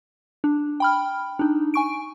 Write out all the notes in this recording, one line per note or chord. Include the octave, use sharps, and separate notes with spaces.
D4
G5 B5 F6
D4 D#4
G#5 C#6 D7